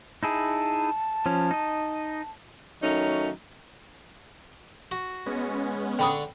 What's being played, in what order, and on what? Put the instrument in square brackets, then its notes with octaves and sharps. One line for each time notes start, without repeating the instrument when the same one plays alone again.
[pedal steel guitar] D#4 E4 G#4 [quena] A5
[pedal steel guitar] F3 C#4
D#4 D#5
[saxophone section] D#3 F#3 A3 C#4 D#4
[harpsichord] F#4
[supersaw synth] G#3 B3 C#4
[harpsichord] D3 D4 C#6 [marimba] G5 B5 D#6